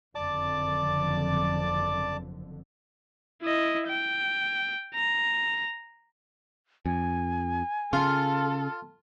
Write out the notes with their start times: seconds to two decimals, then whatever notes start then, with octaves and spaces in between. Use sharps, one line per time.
0.15 F#1 F2 D3 D5 A5 D6
3.43 E4 D#5
3.87 G5
4.95 A#5
6.86 F2 G#5
7.93 C#3 F4 A4